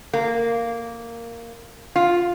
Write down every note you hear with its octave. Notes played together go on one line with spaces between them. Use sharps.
A#3
F4